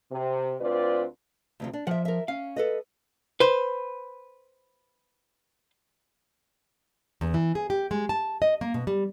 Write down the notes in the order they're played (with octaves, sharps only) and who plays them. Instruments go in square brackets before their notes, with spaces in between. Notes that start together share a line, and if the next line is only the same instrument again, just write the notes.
[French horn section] C3
D2 C4 F4 B4 D5
[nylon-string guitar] D2 C3 F3
D4
[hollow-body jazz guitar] F3 [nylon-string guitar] E5 F#5
[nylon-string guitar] A#4 E5
[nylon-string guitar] C#4 [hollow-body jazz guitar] F5
[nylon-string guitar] A4 B4 D#5
[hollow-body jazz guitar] B4 C5
[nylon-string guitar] E2
E3
G#4
G4
G#3
A5
D#5
A#3
B2
G3